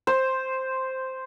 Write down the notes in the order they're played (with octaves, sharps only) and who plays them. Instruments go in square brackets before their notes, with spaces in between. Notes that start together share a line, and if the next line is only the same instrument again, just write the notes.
[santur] C5